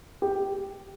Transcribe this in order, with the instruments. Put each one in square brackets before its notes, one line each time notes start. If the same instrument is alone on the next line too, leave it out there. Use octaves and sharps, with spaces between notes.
[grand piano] G4